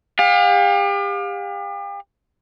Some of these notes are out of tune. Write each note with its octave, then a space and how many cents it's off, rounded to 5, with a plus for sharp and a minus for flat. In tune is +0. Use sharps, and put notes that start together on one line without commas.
G4 +40 F5 +35